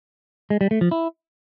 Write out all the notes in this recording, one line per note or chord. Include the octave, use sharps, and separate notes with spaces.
G#3
G3
A3
F3
E4